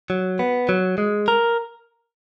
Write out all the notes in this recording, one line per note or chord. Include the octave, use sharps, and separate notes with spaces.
F#3
B3
F#3
G#3
A#4